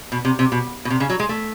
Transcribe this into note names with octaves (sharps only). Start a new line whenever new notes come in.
B2
C3
C3
B2
B2
C3
C#3
F#3
G#3
A3